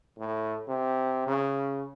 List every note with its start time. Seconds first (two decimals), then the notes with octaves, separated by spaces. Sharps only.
0.18 A2
0.68 C3
1.27 C#3